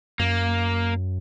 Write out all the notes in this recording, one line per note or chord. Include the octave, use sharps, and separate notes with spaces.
F#2 A#3